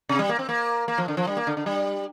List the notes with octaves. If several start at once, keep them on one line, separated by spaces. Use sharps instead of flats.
C3
G3
A#3
C4
A#3
A#3
F3
D3
F3
G3
A#3
D3
D3
G3